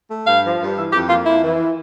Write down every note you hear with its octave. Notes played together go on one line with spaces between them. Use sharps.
A3
G2 F5
F3
G2
E3 E5
F2 G4
A#3 F4
F2 E4
E3